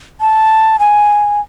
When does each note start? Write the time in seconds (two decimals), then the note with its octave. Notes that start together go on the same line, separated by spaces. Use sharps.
0.21 A5
0.79 G#5